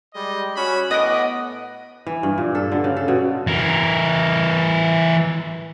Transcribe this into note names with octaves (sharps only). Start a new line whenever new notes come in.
G3 G#3 D#5
C#4 F#4 B5
A2 B3 D#5 F#5 D6
E3
G2
A#2
A4
D3
C#3
A4
B2
E3 A#4